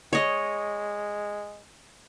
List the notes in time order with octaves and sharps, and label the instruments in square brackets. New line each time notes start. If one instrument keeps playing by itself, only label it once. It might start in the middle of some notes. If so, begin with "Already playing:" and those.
[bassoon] G#3 [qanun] C#5 D#5